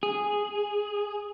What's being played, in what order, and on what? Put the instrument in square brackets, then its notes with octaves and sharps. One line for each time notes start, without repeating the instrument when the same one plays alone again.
[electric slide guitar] G#4